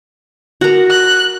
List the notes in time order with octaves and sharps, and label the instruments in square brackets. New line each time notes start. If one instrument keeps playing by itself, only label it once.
[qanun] F#4 A#4
[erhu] F#6